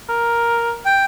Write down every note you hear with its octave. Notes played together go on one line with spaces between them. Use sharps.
A#4
G5